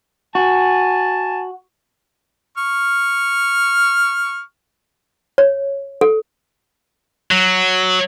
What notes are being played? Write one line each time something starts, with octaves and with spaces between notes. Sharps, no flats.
F#4 G#5 A5
C#6 F6
C#5
A4
F#3